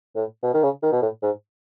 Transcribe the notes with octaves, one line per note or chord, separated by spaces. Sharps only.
A2
B2
D#3
C#3
D#3
B2
A2
G#2